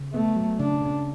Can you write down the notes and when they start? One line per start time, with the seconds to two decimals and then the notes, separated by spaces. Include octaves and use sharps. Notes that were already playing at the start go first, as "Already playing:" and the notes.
Already playing: C#3
0.13 A3 B3
0.36 F#3
0.59 C#3 D4
0.81 C#3